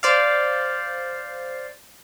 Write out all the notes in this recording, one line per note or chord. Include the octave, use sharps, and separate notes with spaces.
C5 D5 F5